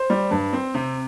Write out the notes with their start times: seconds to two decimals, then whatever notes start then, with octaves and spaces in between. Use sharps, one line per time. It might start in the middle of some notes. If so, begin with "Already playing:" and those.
Already playing: C5
0.10 G3
0.31 G2
0.53 C4
0.74 C3